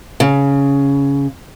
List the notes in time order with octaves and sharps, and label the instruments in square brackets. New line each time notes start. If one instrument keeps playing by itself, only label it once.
[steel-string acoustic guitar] C#3